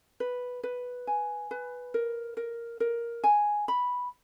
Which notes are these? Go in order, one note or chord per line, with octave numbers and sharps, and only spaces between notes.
B4
B4
G#5
B4
A#4
A#4
A#4
G#5
B5